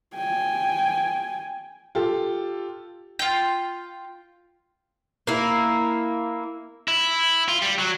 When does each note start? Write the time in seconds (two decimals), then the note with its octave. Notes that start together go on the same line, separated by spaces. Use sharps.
0.15 G5 G#5
1.95 F4 G4 A4
3.19 F4 G5
5.27 A#3 E4
6.88 E4
7.49 F4
7.62 G3
7.79 F#3